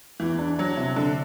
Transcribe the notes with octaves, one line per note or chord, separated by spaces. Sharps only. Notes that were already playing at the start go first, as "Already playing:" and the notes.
E2 E3
D4
F#3 D4
C3
D3 D4